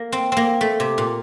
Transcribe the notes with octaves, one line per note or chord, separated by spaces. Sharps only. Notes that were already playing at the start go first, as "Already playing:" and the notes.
Already playing: A#3
C4
A#3 C4
A3
C3
A#2